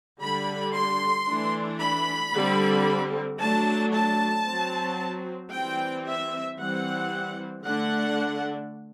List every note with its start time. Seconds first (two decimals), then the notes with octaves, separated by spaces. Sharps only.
0.21 D3 G3 D4 B5
0.74 C6
1.27 E3 A3 D4
1.80 B5
2.34 D3 G3 C4
3.40 F#3 A3 D4 A5
3.93 A5
4.46 F#3 C4
5.52 E3 G3 C4 G5
6.05 E5
6.58 E3 G3 C4 F#5
7.64 D3 A3 D4 F#5